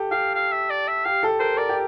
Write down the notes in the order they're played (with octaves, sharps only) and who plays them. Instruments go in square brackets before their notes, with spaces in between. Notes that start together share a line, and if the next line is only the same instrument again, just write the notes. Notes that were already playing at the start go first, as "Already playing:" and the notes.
Already playing: [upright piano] G4 A4
[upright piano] G4 [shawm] F5
[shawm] F5
E5
D5
E5
[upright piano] G4 [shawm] F5
[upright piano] A4
[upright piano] A#4 [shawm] C5
[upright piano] A#4 [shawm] D5
[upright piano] G4